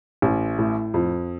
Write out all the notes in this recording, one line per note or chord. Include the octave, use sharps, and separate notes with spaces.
A1
A2
F2